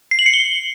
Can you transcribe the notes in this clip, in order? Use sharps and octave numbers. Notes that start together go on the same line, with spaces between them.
C7
F#7
C#7
G7